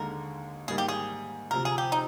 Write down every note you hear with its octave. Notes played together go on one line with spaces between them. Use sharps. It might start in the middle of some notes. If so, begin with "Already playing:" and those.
Already playing: D#2 D3 G#3 D#4 A#4
G#2 D#3 G3 A#3 G#4
G4
G#4
D2 C3 F3 A#4
G#4
G4
D#4